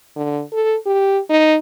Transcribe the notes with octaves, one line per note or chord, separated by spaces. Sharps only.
D3
A4
G4
D#4